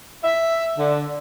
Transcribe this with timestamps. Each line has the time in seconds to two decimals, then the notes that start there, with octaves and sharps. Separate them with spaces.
0.24 E5
0.77 D3